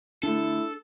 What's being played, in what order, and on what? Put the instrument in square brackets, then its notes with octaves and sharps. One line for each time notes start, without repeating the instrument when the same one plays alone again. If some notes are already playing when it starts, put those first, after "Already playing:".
[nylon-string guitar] D3 A3 [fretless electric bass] D4 [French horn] E4 [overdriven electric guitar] A4